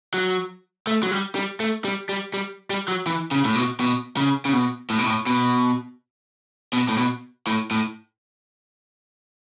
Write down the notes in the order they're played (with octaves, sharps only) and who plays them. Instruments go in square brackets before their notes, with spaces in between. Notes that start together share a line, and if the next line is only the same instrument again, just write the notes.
[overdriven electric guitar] F#3
A3
F#3
G3
G3
A3
G3
G3
G3
G3
F#3
E3
C#3
A2
B2
B2
C#3
C#3
B2
A2
B2
A2
B2
B2
A2
B2
A2
A2